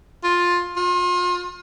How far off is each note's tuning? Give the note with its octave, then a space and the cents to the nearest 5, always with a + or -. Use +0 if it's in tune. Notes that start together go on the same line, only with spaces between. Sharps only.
F4 +10
F4 +35